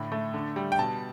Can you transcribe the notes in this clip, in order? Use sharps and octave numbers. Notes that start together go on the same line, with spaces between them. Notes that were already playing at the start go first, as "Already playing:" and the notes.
Already playing: A2 D3 B5
A3
D3
G3
G5
B2 A5